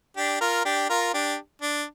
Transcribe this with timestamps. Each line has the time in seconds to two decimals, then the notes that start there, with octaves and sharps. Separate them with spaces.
0.17 D4 G4
0.41 F4 A#4
0.65 D4 G4
0.90 F4 A#4
1.14 D4 G4
1.62 D4